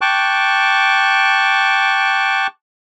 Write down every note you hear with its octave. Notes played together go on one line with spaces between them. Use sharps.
G5 A5 C#6 D6 F#6